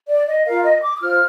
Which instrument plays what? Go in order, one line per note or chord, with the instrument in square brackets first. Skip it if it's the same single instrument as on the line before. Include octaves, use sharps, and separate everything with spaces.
[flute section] D5
D#5
F4 A#4 F5
D#5
D6
D#6
F4 C5 F6